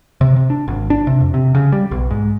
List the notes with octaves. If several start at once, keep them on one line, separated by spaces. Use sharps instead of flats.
C3
C3
D4
G#1
D4
C3
F2
C3
C#3
G3
B1
G#2